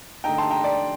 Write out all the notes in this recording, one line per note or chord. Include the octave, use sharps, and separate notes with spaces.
D3 A3 D#4 G5 A#5
A5 C6
G5 A#5
D5